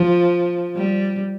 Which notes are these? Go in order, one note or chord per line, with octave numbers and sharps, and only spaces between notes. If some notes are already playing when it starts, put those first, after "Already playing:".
Already playing: F3
G3